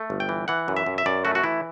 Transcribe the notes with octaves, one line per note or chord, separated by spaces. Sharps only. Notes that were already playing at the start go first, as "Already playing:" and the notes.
Already playing: A3
G1
G5
E3
E3 F#5
F#2
E5
F#2
E5
F#2 D5
A3 F#4
F#4
E3 E4